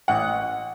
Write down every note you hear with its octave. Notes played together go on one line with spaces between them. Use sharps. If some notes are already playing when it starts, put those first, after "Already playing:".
A1 F#5